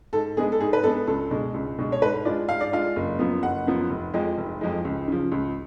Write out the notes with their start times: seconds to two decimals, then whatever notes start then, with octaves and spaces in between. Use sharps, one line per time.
0.13 G#2 A4
0.37 G#3 B3 D4 G#4
0.52 A4
0.60 G#2 G#4
0.73 B4
0.83 G#3 B3 D4 A4
1.07 C#2 A4
1.31 B2 G#3 D4
1.54 C#2
1.79 B2 G#3 D4
1.92 C#5
2.02 G#2 B4
2.25 G#3 D4 F4 D5
2.49 G#2 F5
2.61 D5
2.73 G#3 D4 F4 F5
2.96 F#1
3.19 F#2 F3 B3
3.43 F#1 F#5
3.67 F#2 F3 B3
3.90 F1
4.14 F2 F3 G#3
4.38 F1
4.61 F2 F3 G#3
4.85 C#2
5.08 C#3 F3
5.32 C#2